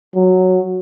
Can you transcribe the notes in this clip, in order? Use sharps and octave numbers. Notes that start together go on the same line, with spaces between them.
F#3